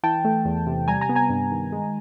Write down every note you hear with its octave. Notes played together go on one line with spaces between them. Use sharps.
E3 G5 A5
A3
E2
C3
G3 G#5 A#5
G#5 A#5
B3
G#5 A#5
G2
D#3
G#3